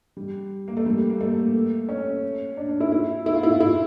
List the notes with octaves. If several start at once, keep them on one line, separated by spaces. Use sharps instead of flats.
G3
A#3
A3
G3
A#3
A3
C#4
D4
D4
E4
E4
E4
F4
E4
F4
E4